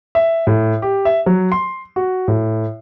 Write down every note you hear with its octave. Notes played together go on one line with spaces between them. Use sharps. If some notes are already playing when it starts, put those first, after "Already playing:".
E5
A2
G4
E5
F#3
C6
F#4
A2